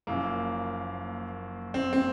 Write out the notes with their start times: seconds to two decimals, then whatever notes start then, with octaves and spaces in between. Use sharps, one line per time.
0.07 F#1 F#2 F3 A#3
1.74 C4
1.93 C4